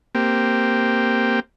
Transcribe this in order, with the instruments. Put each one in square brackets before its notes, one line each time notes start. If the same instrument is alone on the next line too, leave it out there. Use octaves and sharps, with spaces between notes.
[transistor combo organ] A#3 C4 G4